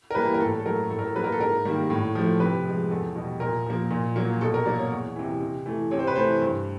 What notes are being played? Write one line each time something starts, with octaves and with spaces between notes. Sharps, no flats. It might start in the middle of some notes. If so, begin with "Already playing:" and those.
A#4
E3 G3 A#3 B4
A#4
A2 A4
A4
F#3 A3 A#4
A2 A4
A#4
A4
F#3 A#3 B4
A#4
A4
G#2 A#4
D#3 G3 A#3
A2
F3 A3
C3 B4
F3 G#3
E2 A4
B2 G3
A#2 A#4
F3 A#3
A#2
F#3 A#3
B2 A4
A#4
F#3 A#3 D5
C#5
E2
C3 E3
C3
E3 A3
C3 C#5
C5
B4
E3 A3 C5
G2